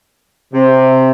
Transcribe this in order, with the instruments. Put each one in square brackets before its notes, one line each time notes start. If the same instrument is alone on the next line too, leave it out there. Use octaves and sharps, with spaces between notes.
[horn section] C3